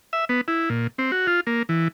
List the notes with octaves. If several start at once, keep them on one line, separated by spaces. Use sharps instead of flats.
E5
B3
E4
A#2
C4
F#4
F4
A#3
E3